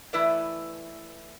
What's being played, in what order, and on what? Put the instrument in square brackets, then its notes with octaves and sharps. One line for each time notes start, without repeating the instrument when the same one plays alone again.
[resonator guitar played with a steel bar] E3 A3 E4 B4 D5